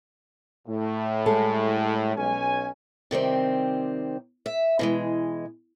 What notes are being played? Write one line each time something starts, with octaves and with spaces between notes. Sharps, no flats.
A2
G3 G#3 A4
B1 C#4 G#5
C3 D#3 G3 C4
E5
B2 E3 G#3